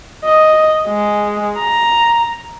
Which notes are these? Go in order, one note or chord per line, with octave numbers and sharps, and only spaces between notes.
D#5
G#3
A#5